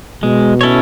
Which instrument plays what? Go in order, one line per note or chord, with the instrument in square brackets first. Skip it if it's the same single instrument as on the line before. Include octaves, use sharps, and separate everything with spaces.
[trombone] B2 [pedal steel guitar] G#3
[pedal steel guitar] C#4 E4 A4 C#5